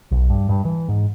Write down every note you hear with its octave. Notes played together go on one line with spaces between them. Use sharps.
B1
G2
G2
E3
G#2